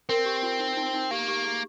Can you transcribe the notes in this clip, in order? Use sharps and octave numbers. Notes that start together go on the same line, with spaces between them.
C4 A#4
G4
F4
D#4
D#4
D#4
A#3 G4
G4
G#4